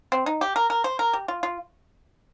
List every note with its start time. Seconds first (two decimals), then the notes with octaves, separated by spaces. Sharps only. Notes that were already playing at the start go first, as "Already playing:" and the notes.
0.12 C4
0.26 D#4
0.41 G4
0.56 A#4
0.70 A#4
0.84 C5
0.99 A#4
1.13 G4
1.28 F4
1.43 F4